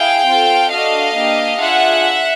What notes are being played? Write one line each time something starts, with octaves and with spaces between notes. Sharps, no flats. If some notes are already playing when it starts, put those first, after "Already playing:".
Already playing: E4 G#4 F5 G5
C4 F4 A4
D4 F#4 A4 D#5 F5
A#3 D4 G4
D4 F4 G#4 E5 F#5